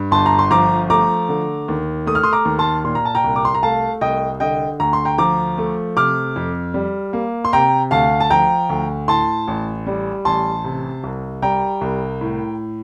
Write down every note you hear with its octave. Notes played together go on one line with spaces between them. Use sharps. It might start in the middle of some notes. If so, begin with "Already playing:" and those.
Already playing: G2
G1 A5 C6
A#5
C6
F3 A#5 D6
A3 A#5 D6
D3
D#2
A3 D#6
F6
C6 D#6
A#5 D6
D#2
A5 C6
A#2 C6
A#5
A5
G5 A#5
C2
D6
C6
A#5
A3 F5 A5
C2 D#5 G5
D3 D#5 G5
D2 A#5
C6
G5 A#5
F3 A#5 D6
A3
C3 D6 F6
F2
G3
A#3
C6
C3 G5 A#5
D2 F5 A5
A5
F3 G5 A#5
D2
A2 A5 C6
A1
G3
A1 A5 C6
C3
C2
G3 G5 A#5
C2
A2